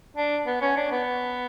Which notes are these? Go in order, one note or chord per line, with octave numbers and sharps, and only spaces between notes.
D4
B3
C#4
D4
B3